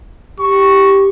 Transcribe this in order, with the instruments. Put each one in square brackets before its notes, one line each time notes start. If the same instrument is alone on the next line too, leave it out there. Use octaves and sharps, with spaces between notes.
[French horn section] G4 [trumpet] C#6